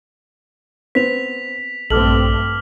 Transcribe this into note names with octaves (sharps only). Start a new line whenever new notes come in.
B3 C4 B6 F7
A#1 G2 A3 C4 A4 D6 F6 F#7